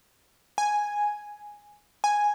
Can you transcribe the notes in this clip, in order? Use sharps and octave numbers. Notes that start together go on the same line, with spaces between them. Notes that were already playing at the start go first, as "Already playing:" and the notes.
G#5
G#5